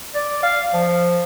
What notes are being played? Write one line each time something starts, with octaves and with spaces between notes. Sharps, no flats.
D5
F5
F3